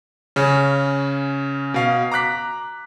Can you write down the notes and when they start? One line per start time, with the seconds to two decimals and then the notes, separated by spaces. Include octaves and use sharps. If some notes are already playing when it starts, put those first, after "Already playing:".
0.36 C#3 C#4
1.74 B2 F5
2.12 A#5 D6 F#6 B6